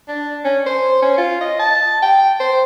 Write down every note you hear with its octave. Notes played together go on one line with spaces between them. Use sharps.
D4
C#4
C5
C#4
F4
D#5
A5
G5
C5